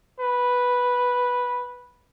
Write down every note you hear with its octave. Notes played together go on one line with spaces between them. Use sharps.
B4